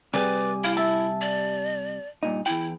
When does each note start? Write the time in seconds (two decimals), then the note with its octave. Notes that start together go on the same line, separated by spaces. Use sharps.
0.14 C3 G3 G#4 B4 D5
0.64 E4 F5
0.77 E5 A5
1.21 D5
2.23 G2 A#2 D#4
2.46 E2 E4 G5